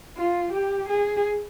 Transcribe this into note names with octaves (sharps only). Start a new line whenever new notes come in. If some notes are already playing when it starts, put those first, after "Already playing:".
F4
G4
G#4